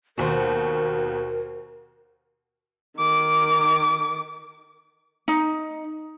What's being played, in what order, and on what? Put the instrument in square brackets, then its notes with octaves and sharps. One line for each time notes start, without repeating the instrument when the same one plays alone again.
[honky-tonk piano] D#2 B2 [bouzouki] F#4 C5 [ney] A#4
[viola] D#3 D6
[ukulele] D#4